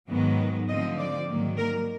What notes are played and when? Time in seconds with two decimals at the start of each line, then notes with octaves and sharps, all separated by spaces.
0.08 G#2 D#3 F#3 B3
0.68 D3 F3 A3 C4 D#5
0.97 D5
1.27 G#2 D#3 F#3 A#3
1.57 A#4